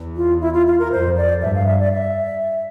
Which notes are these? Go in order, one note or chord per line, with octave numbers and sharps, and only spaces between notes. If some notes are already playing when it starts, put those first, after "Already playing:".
Already playing: E2
F4
E4
F4
F4
A#4
F2 C5
D5
G2 E5
F5
E5
D5
E5